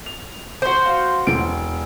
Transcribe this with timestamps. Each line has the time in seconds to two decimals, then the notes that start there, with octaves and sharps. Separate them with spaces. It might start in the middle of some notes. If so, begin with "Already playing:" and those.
0.06 F7
0.62 F#4 C5
0.86 F5
1.27 E1 E3 D7